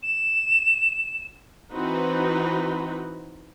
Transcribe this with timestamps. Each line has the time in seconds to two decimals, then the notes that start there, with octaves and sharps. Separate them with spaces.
0.03 E7
1.72 E3 C4 D#4 F#4 B4